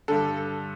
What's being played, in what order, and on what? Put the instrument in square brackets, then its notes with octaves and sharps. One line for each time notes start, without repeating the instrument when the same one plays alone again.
[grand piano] G2 D3 A4